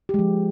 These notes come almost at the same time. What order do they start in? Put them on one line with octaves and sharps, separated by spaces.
G4 G#3 F3